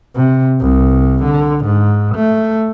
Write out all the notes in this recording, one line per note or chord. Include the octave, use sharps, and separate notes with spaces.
C3
C2
D3
G#2
A3